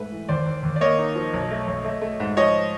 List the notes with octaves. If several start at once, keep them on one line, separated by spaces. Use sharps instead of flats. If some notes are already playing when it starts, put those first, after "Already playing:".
Already playing: G#2 A3 B4
E3
D#2 C5 D5
D#2
D#2
D5
A#3 C#5 D#5
D#4
F3
B1
A3
B1
A3
A3
G#2
F3 C#5 D#5